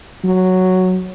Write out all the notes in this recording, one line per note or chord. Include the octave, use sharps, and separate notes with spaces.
F#3